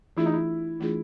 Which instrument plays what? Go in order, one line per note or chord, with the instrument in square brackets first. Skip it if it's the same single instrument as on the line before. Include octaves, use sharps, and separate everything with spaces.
[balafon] E3 A3 D4 F4 G#4 [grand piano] E4
[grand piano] D#4
E4
[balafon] E3 A3 D4 F4 G#4